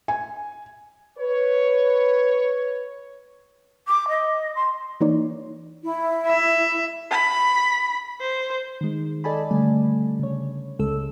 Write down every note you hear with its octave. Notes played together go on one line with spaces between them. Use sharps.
G#5
B4 C#5
D6
D#5
C6
E3 A#3 D#4 C#5 D5
E4
E5
B5
C5
D#3 G#3
A4 D5 D#5 G#5 A5 B5
D3 G3 A3 G#5
C#3 C#5
C#2 C#3 G#3 A4 E6